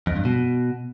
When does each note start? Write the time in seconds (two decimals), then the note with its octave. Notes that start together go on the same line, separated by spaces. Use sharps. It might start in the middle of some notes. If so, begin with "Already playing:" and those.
0.07 F2
0.16 G2
0.25 B2